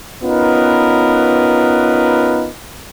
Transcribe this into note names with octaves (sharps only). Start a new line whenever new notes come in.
B3 C#4 D#4 F4 A#4 B4